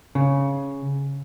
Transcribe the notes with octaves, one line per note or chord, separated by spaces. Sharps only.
C#3